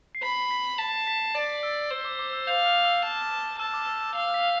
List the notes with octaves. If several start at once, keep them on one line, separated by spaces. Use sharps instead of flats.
C7
B5 B6
B6
A5 B6
B6
D5 A6
E6
C5 E6
D6
D6
E6
F5 G6
F6
E6
A5
A5 E6
D6
E6
E6
F5 E6
B6